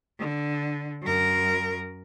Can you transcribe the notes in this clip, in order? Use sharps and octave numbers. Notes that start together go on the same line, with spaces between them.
D3
F#2 A#4